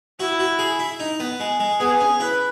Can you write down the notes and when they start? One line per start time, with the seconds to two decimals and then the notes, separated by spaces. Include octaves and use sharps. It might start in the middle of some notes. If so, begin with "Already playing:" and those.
0.20 E4 F#4
0.39 F#4
0.59 G#4
0.79 E4
1.00 D#4
1.20 B3
1.40 G#3
1.60 G#3
1.80 B3 G#4
2.00 C#4
2.20 E4 B4